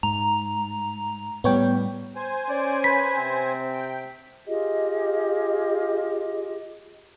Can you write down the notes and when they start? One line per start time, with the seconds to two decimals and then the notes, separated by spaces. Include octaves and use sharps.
0.03 G#2 A#5
1.44 A2 G3 B3 C#5 G5
2.16 C5 G#5
2.49 C#4 D5
2.84 B4 B6
3.17 C3 C4
3.73 G5
4.47 F4 G4 G#4 D#5